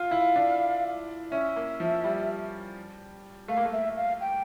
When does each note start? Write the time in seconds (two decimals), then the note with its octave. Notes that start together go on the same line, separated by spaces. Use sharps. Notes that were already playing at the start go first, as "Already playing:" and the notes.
Already playing: F4 F5
0.11 E4
0.36 D4
1.32 C#4 E5
1.56 A#3
1.80 F3
2.04 G3
3.48 A3 F5
3.57 A#3
3.66 A3
3.73 E5
3.97 F5
4.21 G5